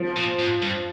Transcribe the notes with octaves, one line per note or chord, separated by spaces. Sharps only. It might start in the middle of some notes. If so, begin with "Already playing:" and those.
Already playing: F3
A#2
G#2
G2